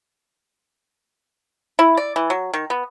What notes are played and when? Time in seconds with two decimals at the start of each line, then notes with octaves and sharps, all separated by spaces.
1.79 E4
1.97 D5
2.16 E3
2.30 F#3
2.54 D#3
2.70 B3